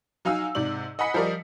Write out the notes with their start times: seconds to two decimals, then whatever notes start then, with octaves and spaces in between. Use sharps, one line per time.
0.25 F#3 D#4 F5 G#5 E6
0.55 G#2 C3 D5 F#7
0.99 D#5 F#5 G#5 B5 B6 C#7
1.14 F3 G3 A#4 D5 D#5